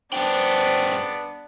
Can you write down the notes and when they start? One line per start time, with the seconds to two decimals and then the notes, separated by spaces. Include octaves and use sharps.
0.13 G2 B3 D4 G#4 C5 G5